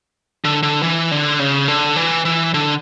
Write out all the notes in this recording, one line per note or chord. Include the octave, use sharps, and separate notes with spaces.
D3
D3
E3
D3
C#3
D3
E3
E3
D3